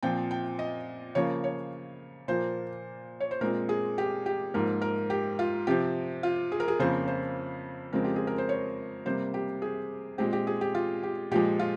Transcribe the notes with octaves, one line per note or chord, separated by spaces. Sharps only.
A#2 F3 C4 G5
G5
D#5
C#3 F3 A#3 C#5
C#5
A#2 F3 A#3 C5
C#5
C5
A#2 G#3 C4 A#4
G#4
G4
G4
G#2 F3 A#3 A#4
A#4
G4
F4
C3 F3 C4 G4
F4
G#4
A#4
G#4
F2 C#3 F3 A#3 C5
C5
F2 C#3 G#3 C4 A#4
G4
G#4
A#4
C5
C#5
C3 G3 A#3 C5
G4
G#4
A#2 G#3 C4 G4
G4
G#4
G4
F4
G4
A#2 F3 G#3 G4
F4